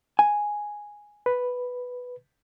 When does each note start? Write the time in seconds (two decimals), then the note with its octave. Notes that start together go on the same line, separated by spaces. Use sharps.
0.19 G#5
1.26 B4